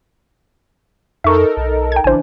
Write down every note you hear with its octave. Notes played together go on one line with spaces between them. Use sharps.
F2 D#4 A4 A#4 E5 C#6
B1
G5 G#6
A1 C#3 E3 D4 C5 G#5